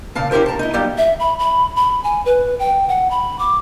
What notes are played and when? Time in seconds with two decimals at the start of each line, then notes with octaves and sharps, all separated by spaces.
0.15 A#2 C#3 F5 A5
0.31 C#4 E4 G4 A#4 C5
0.46 A5 A#5
0.59 D#4 E4
0.73 F#3 G3 A#3 D#4 G4 D5
0.98 E5
1.20 B5
1.39 B5
1.76 B5
2.04 G#5
2.25 B4
2.59 G5
2.89 F#5
3.11 B5
3.39 D6